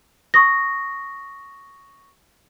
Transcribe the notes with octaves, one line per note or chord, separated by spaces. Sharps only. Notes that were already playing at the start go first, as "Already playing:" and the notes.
C#6 D#6 A#6